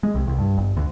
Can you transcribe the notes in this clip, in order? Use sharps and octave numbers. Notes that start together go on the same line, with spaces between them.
G#3
C2
C2
G2
G1
D2